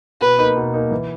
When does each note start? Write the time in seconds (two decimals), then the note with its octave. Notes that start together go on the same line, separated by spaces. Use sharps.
0.21 B2 B4
0.38 A#3 D#4
0.57 B2
0.74 A#3 D#4
0.91 E3